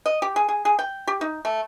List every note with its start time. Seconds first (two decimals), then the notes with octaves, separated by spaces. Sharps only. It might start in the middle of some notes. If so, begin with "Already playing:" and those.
0.06 D#5
0.22 G4
0.36 G#4
0.49 G#4
0.65 G#4
0.79 G5
1.07 G4
1.21 D#4
1.45 A3